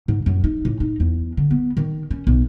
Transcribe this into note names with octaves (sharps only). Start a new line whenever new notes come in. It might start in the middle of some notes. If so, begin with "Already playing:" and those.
G#2
F#2
D#4
A2
D#4
E2
D3
B3
D#3
C#4
B1